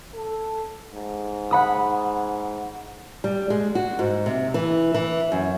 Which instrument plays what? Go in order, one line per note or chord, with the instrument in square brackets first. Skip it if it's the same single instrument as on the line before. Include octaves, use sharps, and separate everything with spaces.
[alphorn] A4
G#2
[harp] F#5 B5 D#6
[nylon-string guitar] G3
G#3
F#4
G#2
C3
E3
E3
F#2